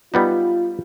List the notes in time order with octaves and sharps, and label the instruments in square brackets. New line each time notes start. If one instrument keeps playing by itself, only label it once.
[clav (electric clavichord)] G3 B3 D#4 [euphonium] F4